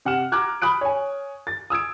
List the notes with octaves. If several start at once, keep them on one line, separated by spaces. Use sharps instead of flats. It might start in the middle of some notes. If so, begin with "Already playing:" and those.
C3 F#5 F6 E7
A#5 D6 F6 F#6 G#6
B5 D#6 F#6 D7
C#5 G#5
A6
D#6 E6 G#6 D7